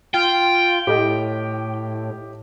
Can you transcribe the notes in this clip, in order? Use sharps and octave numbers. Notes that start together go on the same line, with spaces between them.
F4 G5
A2 G4 D#5